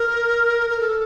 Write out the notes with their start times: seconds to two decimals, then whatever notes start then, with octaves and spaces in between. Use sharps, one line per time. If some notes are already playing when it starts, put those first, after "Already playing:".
Already playing: A#4
0.70 A#4
0.80 A4